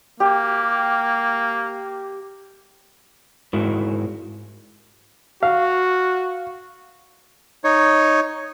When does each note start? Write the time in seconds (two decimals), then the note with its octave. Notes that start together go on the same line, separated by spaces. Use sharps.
0.20 A#3 G4
3.53 G#2 G#3 E4 F#4 A#4
5.43 F#4 F5
7.64 D#4 C#5